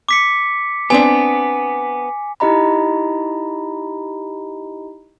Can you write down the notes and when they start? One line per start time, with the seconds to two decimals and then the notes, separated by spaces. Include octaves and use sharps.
0.09 D6 B6 C#7
0.90 B3 C4 D4 G#5
2.40 D#4 E4 G4 D#5 A#5 B5